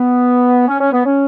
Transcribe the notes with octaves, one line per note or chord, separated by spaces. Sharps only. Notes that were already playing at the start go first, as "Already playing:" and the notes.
Already playing: B3
C#4
C#4
B3
C#4